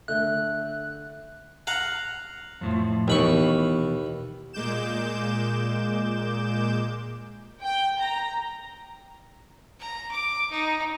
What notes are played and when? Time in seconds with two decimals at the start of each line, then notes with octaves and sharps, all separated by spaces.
0.08 D3 A3 E5 F#6 G6
1.67 F5 F#5 A#5
2.61 F2 A2 F3
3.08 D#2 B2 E3 B5 C#6
4.53 A#2 G#3 D6 G6 E7
7.63 G5
8.00 A#5
9.80 A#5
10.11 D6
10.51 D#4